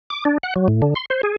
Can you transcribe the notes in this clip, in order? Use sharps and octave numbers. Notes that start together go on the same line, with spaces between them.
D6
D4
F#5
F#3
A2
D3
C6
C5
G#4